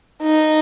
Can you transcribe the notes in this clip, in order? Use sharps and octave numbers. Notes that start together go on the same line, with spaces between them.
D#4